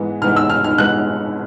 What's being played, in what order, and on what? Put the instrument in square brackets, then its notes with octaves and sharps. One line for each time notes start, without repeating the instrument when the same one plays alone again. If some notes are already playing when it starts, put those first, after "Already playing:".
Already playing: [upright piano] G#2 E3 G#3 B3
G#2 E3 G#3 B3 F6
E6
F6
F6
G#2 E3 G#3 B3 F#6